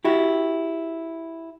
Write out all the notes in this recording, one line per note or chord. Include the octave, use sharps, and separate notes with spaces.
E4 F#4 G4